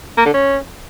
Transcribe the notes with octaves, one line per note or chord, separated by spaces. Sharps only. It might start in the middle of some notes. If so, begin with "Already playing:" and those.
A#3
D3
C#4